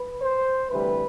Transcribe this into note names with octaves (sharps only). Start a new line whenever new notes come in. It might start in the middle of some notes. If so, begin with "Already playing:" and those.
Already playing: B4
C5
D2 C3 E3 G3 B4